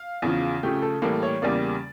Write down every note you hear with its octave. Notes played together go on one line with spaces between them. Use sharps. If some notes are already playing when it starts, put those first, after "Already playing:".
Already playing: F5
E2 C#3 F3
C#3 F3 A3 G4
A4
A2 E3 G3 A#3 A4
C#5
E2 C#3 G3 A#3 D5